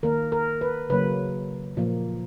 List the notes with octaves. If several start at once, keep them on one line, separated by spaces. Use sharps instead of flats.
D#3 A#3 A#4
A#4
B4
C#3 F#3 A#3 B4
A#2 F3 A#3